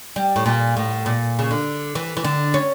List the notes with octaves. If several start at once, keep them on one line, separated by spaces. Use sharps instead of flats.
G3
A2
A#2
A2
A#2
C#3
D3
E3
E3
D3
C#4